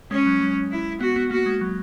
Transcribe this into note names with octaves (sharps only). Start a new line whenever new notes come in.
G#3 C#4
F#3
G#3
E4
B3 F#4
B3
A#3 F#4
G#3
F#3